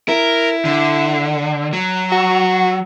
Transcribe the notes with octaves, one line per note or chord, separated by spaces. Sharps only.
E4 A#4
D3
F#3
F#4